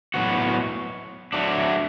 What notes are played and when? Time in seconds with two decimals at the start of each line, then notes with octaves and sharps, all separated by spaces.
0.14 A2 F#3 B3 F#4
1.33 F#3 A3 D4